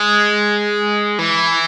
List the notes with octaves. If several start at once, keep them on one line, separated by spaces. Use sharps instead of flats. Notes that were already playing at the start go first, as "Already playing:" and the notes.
Already playing: G#3
E3